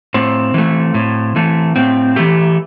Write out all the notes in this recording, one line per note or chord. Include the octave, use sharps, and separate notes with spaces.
A2 C4
E3 A3
A2
E3 A3
A2 C4
E3 A3 G4